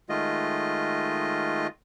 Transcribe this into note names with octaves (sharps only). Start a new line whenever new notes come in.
D#3 G#3 A3 F4 D#5